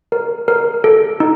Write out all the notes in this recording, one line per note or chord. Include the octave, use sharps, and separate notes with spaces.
A#4
A#4
A4
D#4